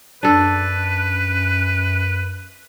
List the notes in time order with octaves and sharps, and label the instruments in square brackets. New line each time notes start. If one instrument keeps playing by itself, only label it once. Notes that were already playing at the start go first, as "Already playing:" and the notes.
[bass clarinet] F#2 [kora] D4 A4 [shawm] B4